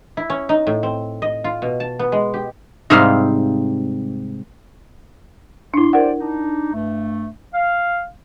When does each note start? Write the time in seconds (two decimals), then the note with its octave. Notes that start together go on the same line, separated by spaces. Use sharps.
0.17 E4
0.30 C#4
0.49 D#4
0.67 A2
0.83 C4
1.22 D#5
1.44 F4
1.62 B2
1.80 A5
1.99 B3
2.12 G#3
2.34 G4
2.90 G#2 C3 G3 C4 D#4 F5
5.74 G#2 D4 E4 C6
5.93 G4 A#4 C5 D5 F#5
6.20 D4 D#4
6.73 G2 A3
7.54 F5